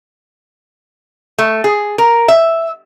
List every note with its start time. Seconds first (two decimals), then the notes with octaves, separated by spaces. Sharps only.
1.38 A3
1.64 G#4
1.98 A#4
2.28 E5